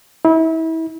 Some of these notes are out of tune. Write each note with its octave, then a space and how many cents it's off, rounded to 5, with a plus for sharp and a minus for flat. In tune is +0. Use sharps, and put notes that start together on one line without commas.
E4 -30